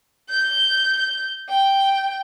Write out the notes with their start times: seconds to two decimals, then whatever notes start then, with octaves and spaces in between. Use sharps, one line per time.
0.30 G6
1.49 G5